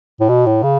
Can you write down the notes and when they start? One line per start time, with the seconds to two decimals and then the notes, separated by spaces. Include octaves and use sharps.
0.20 A2
0.29 B2
0.46 A2
0.63 C#3